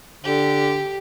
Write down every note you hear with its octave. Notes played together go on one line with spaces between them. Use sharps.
D3 G4